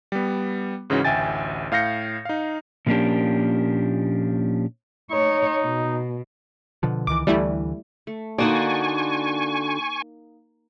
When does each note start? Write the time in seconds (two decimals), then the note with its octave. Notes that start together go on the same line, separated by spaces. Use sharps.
0.12 G3 B3
0.90 G#2 C#3 E3 C#4 F#4
1.05 A1 D2 E5 G5 G#5 A6
1.72 A2 F5 G6 A#6 C#7
2.25 D#4 F5
2.87 A#2 F3 A#3 C#4 D4 G4
5.11 D#4 C#5
5.64 B2
6.83 B2 D3 F3
7.07 C#2 D#3 E3 D6
7.27 D2 E3 G3 A3 E4
8.07 A3
8.38 D3 A#3 D#4 F#4 D5 G#5 C#6